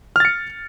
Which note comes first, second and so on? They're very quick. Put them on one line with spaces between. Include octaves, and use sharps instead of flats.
F6 A6 C#7